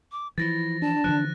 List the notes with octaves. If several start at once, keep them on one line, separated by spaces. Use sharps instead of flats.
D6
E3 F3 E4 A6 A#6
D4 A5
D3 E3 F3 F#6